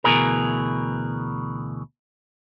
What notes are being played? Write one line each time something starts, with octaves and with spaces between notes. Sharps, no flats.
D2 B2 E3 G#4 A#4